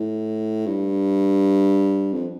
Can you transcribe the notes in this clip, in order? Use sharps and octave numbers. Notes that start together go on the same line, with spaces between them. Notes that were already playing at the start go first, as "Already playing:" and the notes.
Already playing: A2
G2
F2